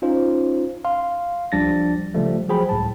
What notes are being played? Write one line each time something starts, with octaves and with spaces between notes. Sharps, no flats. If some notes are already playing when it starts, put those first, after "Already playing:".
C#4 D#4 F4 C5
F5 C6
C#2 F3 G3 D4 A6 A#6
C#3 F3 G3 A3
F3 F#3 G#4 C5 G5 B5
C#2 A2 A5